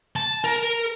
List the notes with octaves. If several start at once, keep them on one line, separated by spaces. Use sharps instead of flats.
A5
A#4